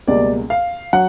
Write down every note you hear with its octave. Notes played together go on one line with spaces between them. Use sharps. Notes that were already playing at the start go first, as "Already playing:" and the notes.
C#2 B2 G3 A#3 D5
F5
F#3 F#5